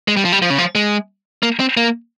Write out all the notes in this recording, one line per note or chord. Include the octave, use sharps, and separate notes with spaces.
G#3
G3
F3
G3
F3
C#3
F3
G#3
A#3
C4
A#3